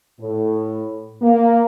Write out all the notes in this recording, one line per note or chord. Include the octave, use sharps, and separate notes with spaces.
A2
A#3